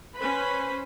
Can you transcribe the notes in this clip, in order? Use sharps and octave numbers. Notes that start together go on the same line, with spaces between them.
C#4 B4 C5 B5